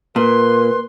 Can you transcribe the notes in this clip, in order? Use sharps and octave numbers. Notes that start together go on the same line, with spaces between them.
A#2 A#3 B4 C6